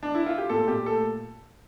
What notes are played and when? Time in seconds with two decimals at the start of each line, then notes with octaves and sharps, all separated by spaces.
0.03 D4
0.15 E4
0.26 F4
0.38 G4
0.50 A#2 A4
0.68 A#2 G4
0.86 A3 A4